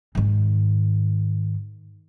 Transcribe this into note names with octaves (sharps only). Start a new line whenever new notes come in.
G#2 D#3